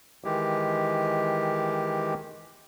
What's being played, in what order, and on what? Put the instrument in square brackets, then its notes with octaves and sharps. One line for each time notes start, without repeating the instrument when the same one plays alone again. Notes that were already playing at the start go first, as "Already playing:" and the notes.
[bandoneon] D#3 E3 G#3 G4